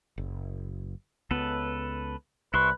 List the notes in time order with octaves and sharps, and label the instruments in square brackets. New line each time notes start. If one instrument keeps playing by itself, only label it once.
[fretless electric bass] F#1
[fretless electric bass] C#2 B3 [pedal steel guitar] A4 B4
[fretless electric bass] C2 [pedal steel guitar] E4 C6 C#6 [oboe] B4